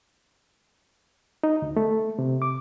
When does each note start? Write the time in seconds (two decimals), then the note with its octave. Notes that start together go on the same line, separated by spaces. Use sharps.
1.44 D#4
1.62 D2
1.76 A3
2.19 C3
2.42 D6